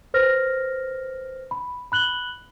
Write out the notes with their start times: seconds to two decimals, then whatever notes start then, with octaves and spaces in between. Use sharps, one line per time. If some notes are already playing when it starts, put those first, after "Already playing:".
0.14 B4 C5 F6 A#6
1.51 B5
1.92 B5 F#6 F#7 G7